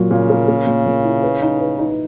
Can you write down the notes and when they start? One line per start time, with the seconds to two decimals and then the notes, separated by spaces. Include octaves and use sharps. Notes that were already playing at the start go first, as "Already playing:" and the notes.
Already playing: A#2 F#3
0.11 A#2 C#3
0.30 A#3
0.48 A#3
0.67 A#2
0.86 A#2
1.04 E4
1.23 B4
1.42 D#4
1.60 B4
1.79 D#4